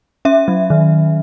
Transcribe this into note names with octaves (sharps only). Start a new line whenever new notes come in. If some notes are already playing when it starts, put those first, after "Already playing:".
C#4 E5
F#3
D#3